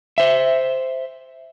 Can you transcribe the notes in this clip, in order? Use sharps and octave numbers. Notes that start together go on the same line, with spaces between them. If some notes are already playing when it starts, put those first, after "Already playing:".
C5 E5